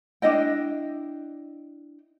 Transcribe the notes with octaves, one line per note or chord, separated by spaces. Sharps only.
D4 E4 D#5 G5